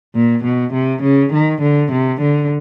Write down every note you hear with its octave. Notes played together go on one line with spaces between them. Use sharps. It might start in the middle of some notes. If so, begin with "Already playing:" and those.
A#2
B2
C3
C#3
D#3
D3
C3
D3